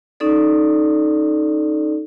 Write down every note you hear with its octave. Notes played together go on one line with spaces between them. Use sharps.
C#4 D#4 A4 D5